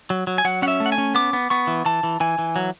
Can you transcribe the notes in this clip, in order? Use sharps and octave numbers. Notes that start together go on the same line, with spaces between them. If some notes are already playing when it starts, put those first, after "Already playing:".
F#3
F#3
G#5
F#3 F#5
C#4 F#5
E5
A3
F#5
G#5
C#4
B3 D6
B3
B3 C#6
E3
E3 A5
E3
E3 G#5
E3
F#3